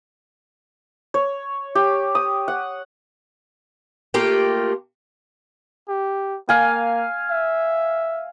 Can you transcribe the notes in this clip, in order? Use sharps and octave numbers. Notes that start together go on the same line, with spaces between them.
C#5
G4
D#6
F#5
A3 A#3 F4 G4
G4
A#3 F5 G#5
E5